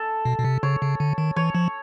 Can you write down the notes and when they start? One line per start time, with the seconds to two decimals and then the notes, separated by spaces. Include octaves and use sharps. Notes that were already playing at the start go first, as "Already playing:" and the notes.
Already playing: A4
0.25 B2
0.38 B2
0.44 C3
0.63 C#3 C#5
0.82 C#3
1.00 D3
1.18 D#3
1.36 E3 C#5
1.55 F3